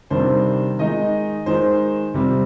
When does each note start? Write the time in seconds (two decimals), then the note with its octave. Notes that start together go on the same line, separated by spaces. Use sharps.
0.10 C3 D#3 G3 D4 C5
0.78 D#3 G#3 D#4 D#5
1.46 D#3 G#3 D#4 C5
2.14 C3 G3 C4